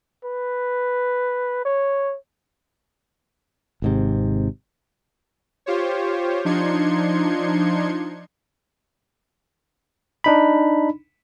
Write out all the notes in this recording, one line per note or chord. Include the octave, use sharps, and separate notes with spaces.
B4
C#5
G#1 G#2 C3
F4 G4 C5 C#5
F3 D4 D#4 C6 G#6 C#7
D4 D#4 B5